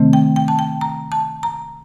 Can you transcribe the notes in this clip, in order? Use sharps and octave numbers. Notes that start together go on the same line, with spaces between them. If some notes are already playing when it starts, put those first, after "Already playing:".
Already playing: C3 D#3 A3 C4
G5
G5
A5
G5
A#5
A5
A#5